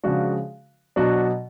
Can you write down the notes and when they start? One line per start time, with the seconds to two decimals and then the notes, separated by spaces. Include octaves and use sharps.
0.03 C#3 F3 G#3 D4 F#4
0.96 B2 F#3 D4 F#4